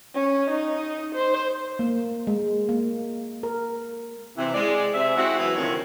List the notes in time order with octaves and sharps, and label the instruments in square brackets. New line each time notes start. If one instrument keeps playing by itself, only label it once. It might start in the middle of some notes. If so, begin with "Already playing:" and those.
[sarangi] C#4
D#4
C5
[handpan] A#3
G#3
A#3
A#4
[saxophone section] C3 E3
G#3 D5
C3 E5
G#3 C4 E4 F#4
E3 F#3 B3 E4
D2 C3 D#3 F3 G3 C#5